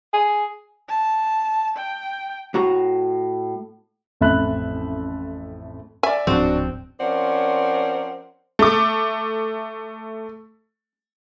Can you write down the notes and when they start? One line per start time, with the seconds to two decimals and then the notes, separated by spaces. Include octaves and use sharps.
0.13 G#4
0.89 A5
1.76 G5
2.54 A2 F#4 A#5
4.21 A1 F2 A3 E5 B5 F#6
6.03 D5 E5 G#5
6.27 D1 G#2 F3 C4 D4 F#4
7.00 F3 C4 C#4 A#4 D5 F#5
8.59 A3 D6